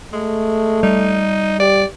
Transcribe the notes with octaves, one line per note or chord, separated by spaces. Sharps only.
G#3 A3
G3 D#4
G4 D5